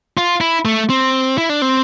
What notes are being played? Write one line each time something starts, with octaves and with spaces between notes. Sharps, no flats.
F4
E4
A3
C4
E4
D4
C4